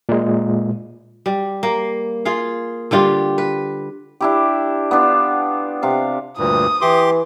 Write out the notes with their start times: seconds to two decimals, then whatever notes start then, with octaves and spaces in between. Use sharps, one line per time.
0.09 A#2 G#3
1.26 G3
1.63 A#3
2.25 F4 G#4 F5
2.91 D3 G3 F4 G4
3.38 B4
4.21 D4 E4 G4
4.91 B3 D4 F4
5.83 C3 F5
6.38 D2 G2 A#2 D#6
6.81 E3 G4 C6 D6